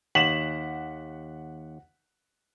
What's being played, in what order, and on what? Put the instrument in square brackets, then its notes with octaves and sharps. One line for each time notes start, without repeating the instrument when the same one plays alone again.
[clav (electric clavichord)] D#2 [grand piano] F#5 E7 [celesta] B6 [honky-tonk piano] F#7